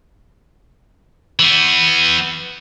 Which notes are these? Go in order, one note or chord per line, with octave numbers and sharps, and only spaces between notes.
E3 B3